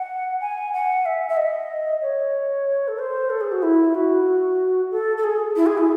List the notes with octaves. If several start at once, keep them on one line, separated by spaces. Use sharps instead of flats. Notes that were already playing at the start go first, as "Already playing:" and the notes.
Already playing: F#5
G#5
F#5
E5
E5
D#5
C#5
A4
C5
A4
G#4
F#4
E4
F#4
A4
A4
G#4
E4
G#4
E4